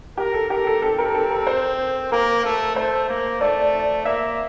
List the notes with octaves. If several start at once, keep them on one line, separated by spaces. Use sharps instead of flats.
G4 A#4
A4
G4 A#4
A4
C4 A4
A#4
A4
A#4
C5
A#3 A#4
A3
A3 C5
A#3
A3 D5
A#3 E5